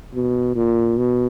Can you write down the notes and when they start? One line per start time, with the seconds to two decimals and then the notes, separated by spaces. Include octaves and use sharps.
0.15 B2
0.55 A#2
0.98 B2